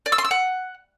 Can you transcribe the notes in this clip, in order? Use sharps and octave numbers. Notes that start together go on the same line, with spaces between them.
D5
E6
C6
E6
F#5